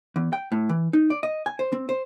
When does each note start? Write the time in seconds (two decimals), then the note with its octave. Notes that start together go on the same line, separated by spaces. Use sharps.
0.16 E2
0.33 G5
0.52 A2
0.69 E3
0.93 D#4
1.10 D5
1.23 D#5
1.46 G#5
1.59 C5
1.72 C4
1.89 C5